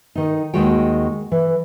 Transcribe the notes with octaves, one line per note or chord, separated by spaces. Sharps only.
D#3 D#4
D#2 D#3 G#3 F#4 C#5 G5
E3